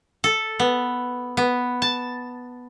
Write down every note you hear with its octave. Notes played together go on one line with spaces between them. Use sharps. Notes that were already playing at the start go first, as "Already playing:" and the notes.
A4
B3
B3
A5